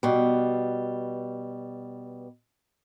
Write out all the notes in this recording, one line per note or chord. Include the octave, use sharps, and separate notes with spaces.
B2 G3